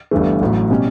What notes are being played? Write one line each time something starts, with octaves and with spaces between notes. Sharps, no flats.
G1 G2 E3 A3
A1 A2 F#3
B2 G3 C#4